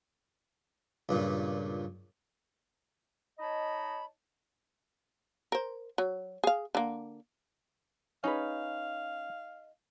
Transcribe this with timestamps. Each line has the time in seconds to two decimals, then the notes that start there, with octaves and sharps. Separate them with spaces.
1.09 C#2 G2 A#2
3.39 D#4 C#5 D#5 A5 B5
5.52 A#4 C5
5.98 F#3
6.44 G#4 F5
6.75 D3 A#3
8.24 C#4 D#4 G#4 B4 F5